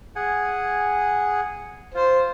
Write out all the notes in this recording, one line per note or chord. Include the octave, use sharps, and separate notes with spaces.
G#4 F#5 G#5
F4 C5